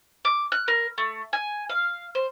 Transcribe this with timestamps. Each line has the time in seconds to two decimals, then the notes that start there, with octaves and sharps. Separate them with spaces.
0.25 D6
0.52 F#6
0.68 A#4
0.98 A3
1.33 G#5
1.70 F5
2.15 C5